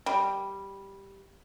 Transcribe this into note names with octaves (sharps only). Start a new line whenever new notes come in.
G3